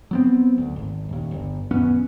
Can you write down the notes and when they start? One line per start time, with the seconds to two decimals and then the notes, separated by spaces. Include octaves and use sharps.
0.11 F#3 B3 C4
0.58 D2
0.76 G#1
1.09 D#1 D#2
1.31 G1
1.71 D#1 F#2 B3 C#4